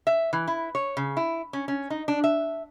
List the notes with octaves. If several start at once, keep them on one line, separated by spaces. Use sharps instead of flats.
E5
E3
E4
C#5
C#3
E4
C#4
C#4
D#4
D4
E5